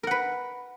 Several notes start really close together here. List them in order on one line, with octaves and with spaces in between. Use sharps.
A#4 F#5 B4